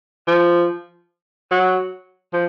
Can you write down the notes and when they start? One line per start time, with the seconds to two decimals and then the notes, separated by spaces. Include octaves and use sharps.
0.27 F3
1.51 F#3
2.33 F3